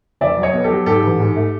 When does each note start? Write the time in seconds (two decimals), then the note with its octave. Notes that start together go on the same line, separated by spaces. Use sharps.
0.21 F1 D5 E5
0.38 F#3
0.43 C#5 D#5
0.54 B2
0.64 G4 A4
0.70 F#3
0.86 G#2 G4 A4
1.03 A1
1.20 G#2
1.36 A3